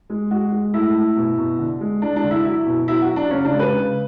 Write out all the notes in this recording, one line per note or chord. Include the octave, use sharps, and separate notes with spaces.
G#3
G#3 F#4
G#3
A3 E4
A3
B2
B2
D3
G#3
G#3 D4
D4
D3
E4
F#3 E4
B2
F#3 E4
F#4
F#3
D4
C#3 C#4
D4
G#3
B4
C#3